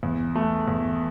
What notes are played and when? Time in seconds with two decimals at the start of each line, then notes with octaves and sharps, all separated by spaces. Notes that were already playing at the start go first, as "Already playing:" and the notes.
0.03 E2
0.35 A3
0.68 E2